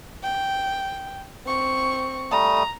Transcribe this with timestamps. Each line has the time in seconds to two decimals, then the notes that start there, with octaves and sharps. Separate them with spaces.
0.23 G5
1.46 C4 C#6
2.32 G3 A3 A#5 D#6